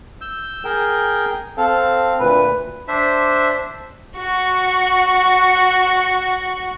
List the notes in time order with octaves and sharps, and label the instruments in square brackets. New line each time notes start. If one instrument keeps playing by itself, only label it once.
[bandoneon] E6 G6
G#4 A#4 G5
[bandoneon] C4 F5 [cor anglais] A4
[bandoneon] D2 A#2 [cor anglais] B4
[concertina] D4 C5 E5
[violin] F#4 C#6